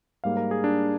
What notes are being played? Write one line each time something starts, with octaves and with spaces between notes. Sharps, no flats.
G#2 G3 A#3 F5
A#4
G#4
D4